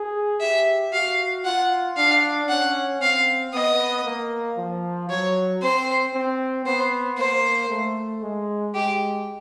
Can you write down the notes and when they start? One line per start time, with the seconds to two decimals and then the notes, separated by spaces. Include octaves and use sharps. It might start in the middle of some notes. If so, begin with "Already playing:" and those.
Already playing: G#4
0.40 G4 E5
0.92 F#4 F5
1.45 F4 F#5
1.97 D4 F5
2.49 C#4 F#5
3.01 C4 F5
3.54 B3 D#5
4.05 A#3
4.58 F3
5.09 F#3 C#5
5.62 C4 C5
6.14 C4
6.66 B3 C5
7.18 A#3 C5
7.70 A3
8.22 G#3
8.74 G#3 G4